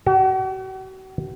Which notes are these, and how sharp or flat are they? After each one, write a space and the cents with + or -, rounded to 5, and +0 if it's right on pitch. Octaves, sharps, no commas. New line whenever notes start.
F#4 +40